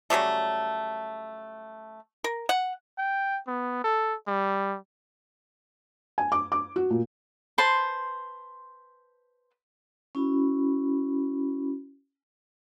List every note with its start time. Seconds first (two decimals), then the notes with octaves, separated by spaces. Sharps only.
0.10 C#3 F#3 G3 A3
2.24 A#4
2.49 F#5
2.98 G5
3.47 B3
3.84 A4
4.27 G3
6.18 G#5
6.32 D6
6.52 D6
6.76 F#4
6.90 A#2
7.58 B4 C5 A5 C6
10.15 C#4 E4 F#4 B5